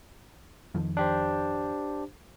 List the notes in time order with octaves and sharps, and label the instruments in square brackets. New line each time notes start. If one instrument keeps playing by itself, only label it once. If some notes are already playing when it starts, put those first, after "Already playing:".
[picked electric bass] F2 D#3 F3
[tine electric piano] D4 G4 C5